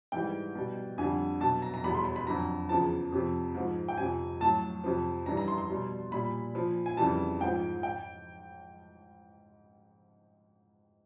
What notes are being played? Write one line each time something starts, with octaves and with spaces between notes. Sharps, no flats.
G#2 E3 G3 G5
B2 G3
F2 D3 G3 G#5
B2 F#3 A5
A#5
A#5
E2 B2 G3 B5
C6
B5
B5
F2 D3 F#3 A#5
E2 C#3 F3 A5
F2 C3 F3
G#2 F3
G5
F2 C3 F3 G#5
A2 F#3 A5
F2 C3 F3
G2 E3 G3 A#5
A#5
C6
C6
B2 G3
A#2 G3 B5
A#2 F3
G#5
F2 C#3 E3 G3 A5
G#2 F3 G5
G5